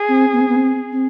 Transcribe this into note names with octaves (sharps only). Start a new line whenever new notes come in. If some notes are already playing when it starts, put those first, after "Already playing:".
Already playing: G#4
C4
B3
C4
B3
C4
C4